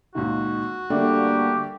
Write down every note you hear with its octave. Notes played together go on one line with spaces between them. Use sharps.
C#2 A#2 D#3 F#4
D3 G3 A3 A#3 D4 G4